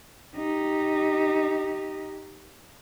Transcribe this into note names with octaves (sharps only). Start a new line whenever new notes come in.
D#4 G4